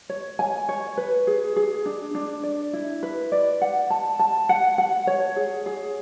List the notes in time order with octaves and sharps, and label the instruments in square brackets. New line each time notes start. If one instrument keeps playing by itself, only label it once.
[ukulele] C#5
G#5
C#5
B4
G#4
G#4
D4
D4
D5
E4
B4
D5
F#5
A5
A5
F#5
F#5
C#5
G#4
G#4